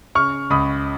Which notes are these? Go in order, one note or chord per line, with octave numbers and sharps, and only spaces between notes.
C#3 C#6 F6
C#2 B5 D#6